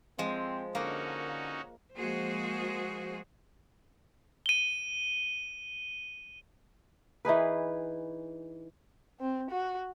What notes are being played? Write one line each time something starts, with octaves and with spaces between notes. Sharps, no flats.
F3 G#3 C4
D3 A#3 C#4 D#4 F#4
F3 G#3 A#3 F#4 G#4 C5
D#7 G7
E3 D#4 G#4 B4
C4
F#4